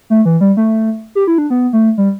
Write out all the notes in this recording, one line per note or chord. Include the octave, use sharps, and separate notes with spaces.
A3
E3
G3
A3
G4
E4
D4
B3
A3
G3